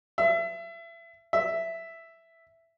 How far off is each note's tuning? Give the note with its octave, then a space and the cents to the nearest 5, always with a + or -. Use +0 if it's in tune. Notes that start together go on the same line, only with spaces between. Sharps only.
E5 +30
E5 +5